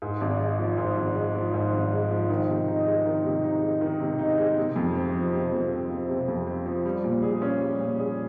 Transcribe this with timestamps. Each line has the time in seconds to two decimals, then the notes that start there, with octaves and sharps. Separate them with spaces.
0.02 G#2
0.21 G#1
0.40 G#3
0.59 F3
0.78 G#2
0.97 G#1
1.15 G#3
1.35 F3
1.54 G#2
1.73 G#1
1.92 G#3
2.10 F3
2.29 D#3
2.49 C3
2.68 D#4
2.87 G#3
3.06 D#3
3.24 C3
3.44 D#4
3.63 G#3
3.81 D#3
4.00 C3
4.19 D#4
4.38 G#3
4.57 C3
4.76 F2
4.95 C4
5.14 F3
5.33 C3
5.52 F2
5.72 C4
5.90 F3
6.08 C3
6.28 F2
6.47 C4
6.66 F3
6.85 G3
7.04 A#2
7.23 G#4
7.42 C#4
7.61 G3
7.80 A#2
7.99 G#4